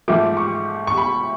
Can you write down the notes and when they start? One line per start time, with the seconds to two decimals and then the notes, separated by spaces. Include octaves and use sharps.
0.08 G#2 F3 A3 D6
0.37 C#6
0.87 C#6
0.98 B5